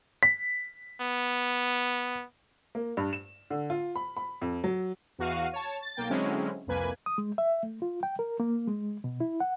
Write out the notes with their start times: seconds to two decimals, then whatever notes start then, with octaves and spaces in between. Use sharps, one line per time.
0.23 B6
1.02 B3
2.75 A#3
2.97 G2
3.13 E7
3.50 D3
3.70 F4
3.96 B5
4.17 B5
4.42 F2
4.64 F#3
5.19 E2 F#4 F5 D#7
5.53 C#5 A5
5.82 A6
5.96 B1 A#3 G5 A6
6.09 D3 F#3 G#3 C4 C#4 E4
6.67 C2 F2 A#3 B4 G#5
7.06 D#6
7.18 G#3
7.38 E5
7.63 A3
7.82 F4
8.03 G5
8.19 A#4
8.40 A#3
8.67 G#3
9.04 B2
9.21 E4
9.40 F#5